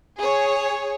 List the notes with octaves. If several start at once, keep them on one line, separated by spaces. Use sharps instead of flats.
G#4 C#5